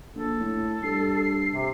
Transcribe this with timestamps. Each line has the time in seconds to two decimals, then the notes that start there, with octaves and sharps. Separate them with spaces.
0.15 A#1 A4
0.40 A2
0.83 G2 C7
1.53 C3